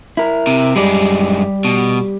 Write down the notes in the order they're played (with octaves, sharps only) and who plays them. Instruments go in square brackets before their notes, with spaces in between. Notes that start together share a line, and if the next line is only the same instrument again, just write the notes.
[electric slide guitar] E4 A#4
[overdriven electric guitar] C3
[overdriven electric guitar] F#2 G#3 [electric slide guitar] G3 G4 D5
[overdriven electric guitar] B2